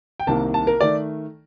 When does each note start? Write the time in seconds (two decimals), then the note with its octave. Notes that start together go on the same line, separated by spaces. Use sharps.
0.20 G5
0.27 C2 C3 D#3 A#3 A5
0.54 A5
0.67 A#4
0.81 D#3 A3 D5